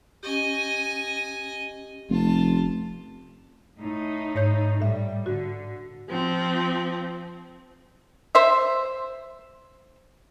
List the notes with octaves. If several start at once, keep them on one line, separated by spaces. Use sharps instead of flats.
C#4 G4 D#5 G#5
F1 F4 A5
A2 D#4
G#2 C#5 G6
A2 G3 E5
D3 F#4
F3 C4
C5 E5